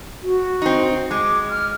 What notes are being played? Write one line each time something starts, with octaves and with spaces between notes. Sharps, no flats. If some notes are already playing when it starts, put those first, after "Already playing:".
F#4
C4 D#4
G#3 D6
F6